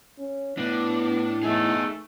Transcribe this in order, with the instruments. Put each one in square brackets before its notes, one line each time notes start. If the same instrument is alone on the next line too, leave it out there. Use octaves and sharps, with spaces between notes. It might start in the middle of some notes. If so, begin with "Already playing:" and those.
[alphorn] C#4
[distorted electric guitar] A2 [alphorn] B3 [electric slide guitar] D4
[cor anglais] A3 [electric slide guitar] B3 G#4 [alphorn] D#4